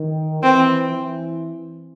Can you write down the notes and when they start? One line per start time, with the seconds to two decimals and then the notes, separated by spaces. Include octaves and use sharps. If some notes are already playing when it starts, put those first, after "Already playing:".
Already playing: D#3
0.43 E3 C4
0.93 E3